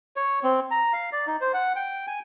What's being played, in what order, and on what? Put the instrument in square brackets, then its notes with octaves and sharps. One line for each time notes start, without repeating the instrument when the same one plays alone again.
[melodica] C#5
C4
A#5
F5
D5
D#4
C5
F#5
G5
G#5